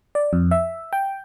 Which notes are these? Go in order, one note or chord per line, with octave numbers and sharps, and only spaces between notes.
D5
F2
E5
G5